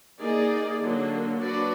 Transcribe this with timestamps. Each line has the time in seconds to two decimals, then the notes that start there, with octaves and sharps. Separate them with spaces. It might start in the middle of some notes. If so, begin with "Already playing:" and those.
0.21 A#3 D#4 G#4 D5
0.81 D3 F#3 A#3
1.40 F#3 D4 F#4 B4 D5